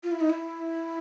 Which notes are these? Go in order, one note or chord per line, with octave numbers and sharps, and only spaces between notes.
F4
E4
D#4
E4